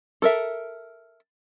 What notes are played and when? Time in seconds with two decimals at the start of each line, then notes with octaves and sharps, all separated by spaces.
0.22 A4 A#4 E5